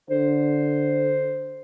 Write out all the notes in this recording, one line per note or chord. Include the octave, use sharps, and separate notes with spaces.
D3 C5